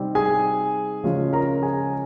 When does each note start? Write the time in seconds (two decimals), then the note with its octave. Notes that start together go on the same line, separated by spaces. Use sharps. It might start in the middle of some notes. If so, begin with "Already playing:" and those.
Already playing: C3 G3 C4 D#4
0.15 G#4 G#5
1.03 C#3 F3 G#3 C#4 F4
1.33 A#4 A#5
1.62 G#4 G#5